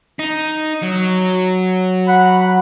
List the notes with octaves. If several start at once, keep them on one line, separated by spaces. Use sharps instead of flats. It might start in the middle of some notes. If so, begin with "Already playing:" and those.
D#4
F#3
F#5 B5